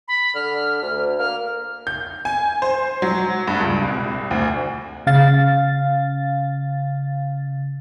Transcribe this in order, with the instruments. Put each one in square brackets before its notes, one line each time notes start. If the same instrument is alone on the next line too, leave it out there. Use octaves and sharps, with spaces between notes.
[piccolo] B5
[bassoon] D3 [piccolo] F6
[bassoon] D2
[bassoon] A#3 [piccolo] F6
[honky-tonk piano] G6
G#5
C5
F#3
G2
C#2
C2
D2
[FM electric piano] C#3 F5 A6